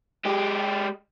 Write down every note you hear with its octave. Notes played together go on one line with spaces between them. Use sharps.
G#3 G4